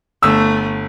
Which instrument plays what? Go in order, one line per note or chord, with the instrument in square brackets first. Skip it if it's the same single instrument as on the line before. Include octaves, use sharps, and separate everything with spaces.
[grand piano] G1 E6 [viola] A3